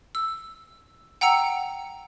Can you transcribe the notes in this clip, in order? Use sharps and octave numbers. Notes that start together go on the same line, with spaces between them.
E6
F#5 G5 A#5 E6 C#7